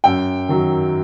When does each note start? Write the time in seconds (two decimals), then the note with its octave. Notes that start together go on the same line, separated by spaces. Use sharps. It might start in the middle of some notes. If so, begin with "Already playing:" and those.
0.04 F#2 G5
0.49 D#3 F#3